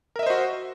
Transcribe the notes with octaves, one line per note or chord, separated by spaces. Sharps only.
F#4 A#4 C5 D#5 E5